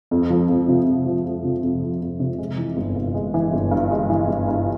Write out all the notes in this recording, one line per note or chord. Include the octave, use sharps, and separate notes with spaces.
F2
F3
F2
C3
F2
F3
F2
C3
F2
F3
F2
C3
G#3
E3
G1
G2
G#3
E3
G1
G2
G#3
E3
G1
G2